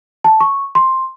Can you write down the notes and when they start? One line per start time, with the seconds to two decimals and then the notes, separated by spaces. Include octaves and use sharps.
0.24 A5
0.40 C#6
0.75 C6